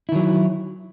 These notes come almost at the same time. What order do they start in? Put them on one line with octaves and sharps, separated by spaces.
E4 D#3 F#3